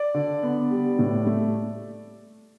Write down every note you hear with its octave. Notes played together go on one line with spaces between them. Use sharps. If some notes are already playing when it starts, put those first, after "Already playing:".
Already playing: D5
D3
B3
G3
A2
A3